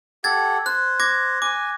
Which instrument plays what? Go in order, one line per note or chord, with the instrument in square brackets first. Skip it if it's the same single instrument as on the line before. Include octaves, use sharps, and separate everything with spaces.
[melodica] G4 A4 F#5 [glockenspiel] G#6 A6
[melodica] C5 [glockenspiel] F#6
[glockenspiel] D6 G#6 A#6
[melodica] G#5 [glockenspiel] D6